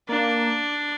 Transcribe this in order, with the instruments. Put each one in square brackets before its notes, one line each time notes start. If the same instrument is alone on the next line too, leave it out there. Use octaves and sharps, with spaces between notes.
[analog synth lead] A#3 [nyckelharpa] D4